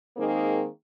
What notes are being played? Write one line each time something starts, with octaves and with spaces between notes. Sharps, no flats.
D#3 G#3 A#3 C4 D#4 G#4